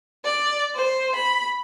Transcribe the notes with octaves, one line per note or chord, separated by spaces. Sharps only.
D5
C5
B5